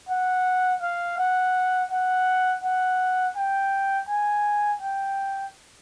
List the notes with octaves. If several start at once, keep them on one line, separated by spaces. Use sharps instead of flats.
F#5
F5
F#5
F#5
F#5
G5
G#5
G5